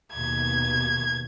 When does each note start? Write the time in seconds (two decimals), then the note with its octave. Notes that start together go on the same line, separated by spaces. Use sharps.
0.13 D#2 B2 G#6